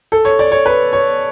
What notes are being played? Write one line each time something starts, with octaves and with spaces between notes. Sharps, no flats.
A4
C#5
D5
C#5
B4
C#5